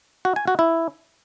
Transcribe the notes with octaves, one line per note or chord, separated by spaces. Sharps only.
F#4
G#5
F#4
E4